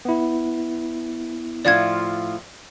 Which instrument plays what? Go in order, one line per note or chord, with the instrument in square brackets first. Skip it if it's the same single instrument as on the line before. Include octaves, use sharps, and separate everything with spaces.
[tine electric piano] B3 E4
[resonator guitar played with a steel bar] A2 F3 F4 [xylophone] D5 G#6